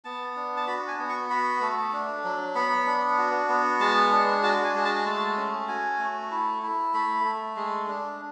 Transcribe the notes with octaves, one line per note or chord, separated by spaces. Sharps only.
B3 A5
D4
A5
F#4 B5
G#5
B3
C#6
F#4 B5
A3
D4
F#3
B3 B5
D4
F#4
B3
G#3 A5
D4
F#4 A5
G#5
G#3
A5
A3 A5
C#4
F#4 G#5
A3
E4
E4
A3 B5
A3
G#3
D4